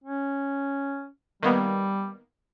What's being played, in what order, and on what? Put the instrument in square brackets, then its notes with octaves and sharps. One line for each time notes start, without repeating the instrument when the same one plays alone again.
[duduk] C#4
[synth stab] D#3 A#3 B3 [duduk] G3